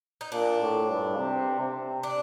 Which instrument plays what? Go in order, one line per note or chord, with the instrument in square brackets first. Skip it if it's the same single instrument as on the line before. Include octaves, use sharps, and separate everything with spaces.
[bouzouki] D#4
[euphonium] A#2 [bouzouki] D4
[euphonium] A2
G2
C3
C3
[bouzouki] D4